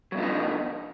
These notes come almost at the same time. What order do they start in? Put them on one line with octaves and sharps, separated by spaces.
F#3 B2 F3 D3 D#4